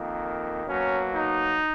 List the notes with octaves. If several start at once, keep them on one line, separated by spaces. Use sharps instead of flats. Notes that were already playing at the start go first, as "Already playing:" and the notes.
Already playing: F2 D#3 A#3
B2 F#3 A#3 C#4
D#4